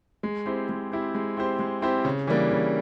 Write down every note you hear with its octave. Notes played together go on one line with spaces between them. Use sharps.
G#3
C4 E4 G4 C5
G#3
C4 E4 G4 C5
G#3
C4 E4 G4 C5
G#3
C4 E4 G4 C5
C#3
E3 G3 A#3 D4
C#3